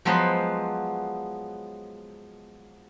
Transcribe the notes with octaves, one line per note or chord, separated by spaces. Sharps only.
F3 F#3 G#3 B3 B4 C5